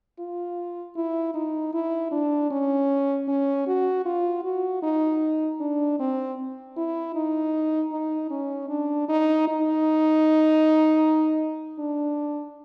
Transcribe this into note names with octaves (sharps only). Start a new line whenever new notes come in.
F4
E4
D#4
E4
D4
C#4
C#4
F#4
F4
F#4
D#4
D4
C4
E4
D#4
D#4
C#4
D4
D#4
D#4
D4